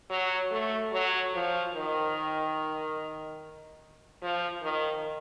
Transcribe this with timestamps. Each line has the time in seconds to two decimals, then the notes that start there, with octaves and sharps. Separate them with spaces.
0.10 F#3
0.51 A3
0.93 F#3
1.34 F3
1.74 D#3
4.22 F3
4.63 D#3